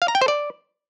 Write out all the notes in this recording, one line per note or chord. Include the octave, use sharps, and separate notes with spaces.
F5
A#5
G5
C5
D5